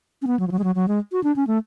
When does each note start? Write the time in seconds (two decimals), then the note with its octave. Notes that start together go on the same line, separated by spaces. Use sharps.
0.22 C#4
0.27 B3
0.39 F#3
0.48 F3
0.51 F#3
0.59 G#3
0.64 F#3
0.75 F#3
0.88 G#3
1.12 F#4
1.24 D4
1.36 C#4
1.47 A3